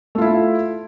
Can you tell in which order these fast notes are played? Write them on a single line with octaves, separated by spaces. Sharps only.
A3 F4 E4